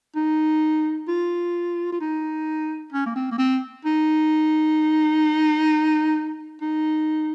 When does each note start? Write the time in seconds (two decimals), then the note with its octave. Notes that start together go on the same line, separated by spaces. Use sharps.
0.16 D#4
1.08 F4
1.93 F4
2.01 D#4
2.93 C#4
3.06 A#3
3.16 C4
3.31 A#3
3.38 C4
3.85 D#4
6.62 D#4